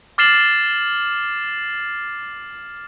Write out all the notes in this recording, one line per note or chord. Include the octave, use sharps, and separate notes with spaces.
D6 F6 A6 C7 E7 F#7